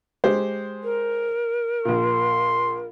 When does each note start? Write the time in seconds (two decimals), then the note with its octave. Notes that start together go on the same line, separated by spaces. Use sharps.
0.24 G#3 G4 C5
0.83 A#4
1.85 A#1 A#2 C6